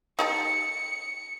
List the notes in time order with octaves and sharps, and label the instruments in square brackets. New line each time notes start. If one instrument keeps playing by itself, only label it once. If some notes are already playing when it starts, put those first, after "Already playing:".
[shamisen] D#4 G4 A4 [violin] C#7